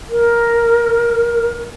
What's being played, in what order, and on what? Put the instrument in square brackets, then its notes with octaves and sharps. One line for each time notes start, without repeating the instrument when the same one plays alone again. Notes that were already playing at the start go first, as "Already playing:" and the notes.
[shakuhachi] A#4